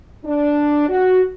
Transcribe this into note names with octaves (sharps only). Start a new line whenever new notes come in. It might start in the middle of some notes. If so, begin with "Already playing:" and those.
D4
F#4